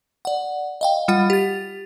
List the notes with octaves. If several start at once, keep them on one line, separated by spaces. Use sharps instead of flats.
D5 F#5
D#5 F5 G5
G3 F4 F#5
G4 A6